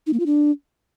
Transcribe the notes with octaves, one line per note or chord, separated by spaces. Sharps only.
D#4
A#3
F4
D4